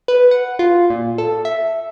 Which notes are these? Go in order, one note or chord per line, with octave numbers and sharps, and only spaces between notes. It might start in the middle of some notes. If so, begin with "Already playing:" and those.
B4
F#5
F4
A#2
A4
E5